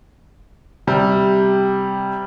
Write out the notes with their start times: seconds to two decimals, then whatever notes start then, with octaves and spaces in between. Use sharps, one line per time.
0.87 C3 G3